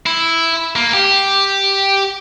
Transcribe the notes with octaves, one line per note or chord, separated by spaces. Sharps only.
E4
A#3
G4